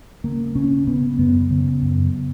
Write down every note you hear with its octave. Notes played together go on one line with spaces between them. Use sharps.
C#3 A#3
C#3 C#4
C#3 B3
F#2 B3
C#3
F#2